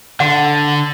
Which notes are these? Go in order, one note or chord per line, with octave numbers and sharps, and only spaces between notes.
D3 F#5